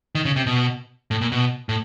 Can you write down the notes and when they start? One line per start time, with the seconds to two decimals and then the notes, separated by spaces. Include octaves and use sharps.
0.15 D#3
0.25 C#3
0.36 C3
0.47 B2
1.11 A2
1.21 A#2
1.32 B2
1.69 A2